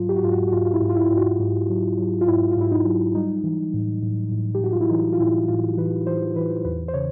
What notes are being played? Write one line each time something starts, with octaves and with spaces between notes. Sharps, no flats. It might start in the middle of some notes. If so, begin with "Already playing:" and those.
Already playing: G#2 F#3 F4
G4
F#4
G#2 F4
F#4
F#4
G#2 F4
F4
E4
G#2
F4
E4
G#2
F#4
G#2
F#3
F#3
F4
G#2 E4
F4
G#2 E4
D#4
F#3
G3 D#4
E3
A2
A2
A2
G4
A2 F#4
F4
E4
E3 D#4
F4
A2 E4
A2 F4
E3 B4
E3 C5
E3 B4
E2 B4
C5
C#3 C#5